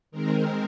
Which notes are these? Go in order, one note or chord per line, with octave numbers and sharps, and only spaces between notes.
D#3 G#3 C4 A#4